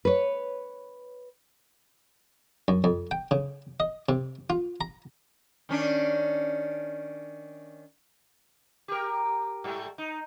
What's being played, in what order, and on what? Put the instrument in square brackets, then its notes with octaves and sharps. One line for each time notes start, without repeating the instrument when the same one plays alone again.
[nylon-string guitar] B4 C#5
[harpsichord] F#2
F2
G5
C#3
D#5
C3
F4
A#5
[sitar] D#3 C#4 D4
G4 A#4
G#2 G3 A3
D#4